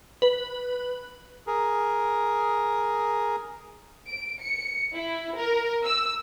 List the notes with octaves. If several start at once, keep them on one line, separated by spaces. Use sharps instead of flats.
B4
G#4 A#4
D7
C#7
E4
A#4
E6